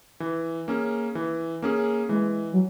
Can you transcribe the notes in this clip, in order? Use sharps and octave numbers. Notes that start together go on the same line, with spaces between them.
E3
A#3 C#4 G#4
E3
A#3 C#4 G#4
E3 G#3
F#3